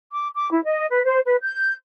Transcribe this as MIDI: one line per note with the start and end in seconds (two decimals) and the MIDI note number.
0.12 0.28 86
0.35 0.50 86
0.51 0.63 64
0.65 0.86 75
0.89 1.02 71
1.04 1.19 72
1.25 1.36 71
1.41 1.73 91